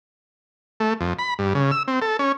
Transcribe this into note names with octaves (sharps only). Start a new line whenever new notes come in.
A3
F2
B5
G2
C#3
E6
C4
A4
C#4